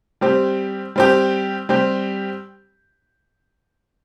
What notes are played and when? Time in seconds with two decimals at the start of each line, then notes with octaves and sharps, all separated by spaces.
0.21 G3 C4 G4
0.96 G3 C4 G4
1.69 G3 C4 G4